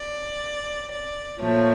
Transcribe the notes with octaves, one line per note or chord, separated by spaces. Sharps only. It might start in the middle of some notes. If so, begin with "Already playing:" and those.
Already playing: D5
D5
A#2 F3 A3 C#5